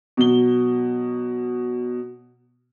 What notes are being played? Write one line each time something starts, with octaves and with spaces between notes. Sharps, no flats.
B2 F#3 G7